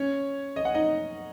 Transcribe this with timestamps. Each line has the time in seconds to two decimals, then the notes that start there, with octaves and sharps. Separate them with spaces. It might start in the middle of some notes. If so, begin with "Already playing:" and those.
Already playing: C#4 C#5
0.56 D#5
0.65 F#5
0.74 D#4 D#5